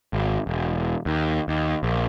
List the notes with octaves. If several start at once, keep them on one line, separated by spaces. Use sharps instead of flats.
G#1
E1
D#2
D#2
A#1